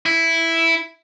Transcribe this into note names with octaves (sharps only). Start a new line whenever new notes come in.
E4